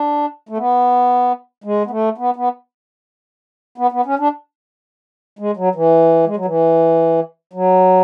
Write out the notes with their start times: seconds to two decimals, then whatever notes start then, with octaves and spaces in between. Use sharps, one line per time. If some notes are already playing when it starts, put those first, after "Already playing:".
Already playing: D4
0.49 A3
0.57 B3
1.64 G#3
1.86 B3
1.91 A3
2.18 B3
2.36 B3
3.78 B3
3.92 B3
4.06 C#4
4.19 D4
5.39 G#3
5.57 F#3
5.75 E3
6.26 G#3
6.36 F#3
6.45 E3
7.53 F#3